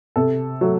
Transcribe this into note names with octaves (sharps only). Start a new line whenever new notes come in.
C3 A4
F#3 A3